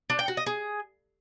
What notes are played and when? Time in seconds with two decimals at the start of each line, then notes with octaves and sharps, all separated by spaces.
0.10 D4
0.19 G5
0.28 F#4
0.37 D#5
0.46 G#4